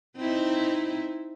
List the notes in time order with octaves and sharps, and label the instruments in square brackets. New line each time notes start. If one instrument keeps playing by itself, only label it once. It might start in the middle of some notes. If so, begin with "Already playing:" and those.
[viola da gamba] C4 D#4 E4